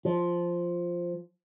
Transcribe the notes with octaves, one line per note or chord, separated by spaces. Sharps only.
F3